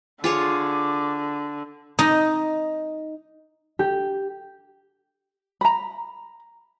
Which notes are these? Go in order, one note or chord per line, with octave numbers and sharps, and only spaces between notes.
D3 F4 G#4 C#5 D6
D#4
G4
A#5 B5